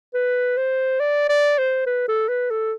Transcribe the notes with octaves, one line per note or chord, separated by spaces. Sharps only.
B4
C5
D5
D5
C5
B4
A4
B4
A4